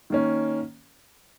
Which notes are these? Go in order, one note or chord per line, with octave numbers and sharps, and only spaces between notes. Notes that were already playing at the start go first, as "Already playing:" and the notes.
D#3 A#3 C#4